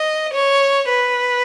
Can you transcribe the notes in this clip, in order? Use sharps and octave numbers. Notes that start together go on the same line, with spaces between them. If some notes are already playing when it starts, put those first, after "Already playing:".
Already playing: D#5
C#5
B4